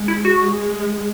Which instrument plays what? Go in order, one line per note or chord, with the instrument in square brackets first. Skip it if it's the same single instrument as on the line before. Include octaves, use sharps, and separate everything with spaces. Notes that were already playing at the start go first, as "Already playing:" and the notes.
Already playing: [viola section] G#3
[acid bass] E4
F#4
[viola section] G#3